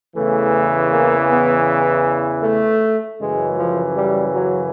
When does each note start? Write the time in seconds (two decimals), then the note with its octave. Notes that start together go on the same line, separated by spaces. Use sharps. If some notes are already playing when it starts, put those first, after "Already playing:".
0.14 E2 C#3 E3 A3
0.91 A#3
1.29 B3
2.44 A3
3.19 F#2 C#3 E3 G#3
3.58 F3
3.96 G3
4.34 F#3